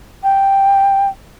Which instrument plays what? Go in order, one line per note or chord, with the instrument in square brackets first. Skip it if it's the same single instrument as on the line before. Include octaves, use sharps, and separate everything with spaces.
[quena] G5